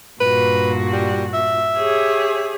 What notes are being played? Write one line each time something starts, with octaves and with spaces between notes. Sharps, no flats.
G2 A#2 F#4 B4
G3
E5
G4 G#4 C#5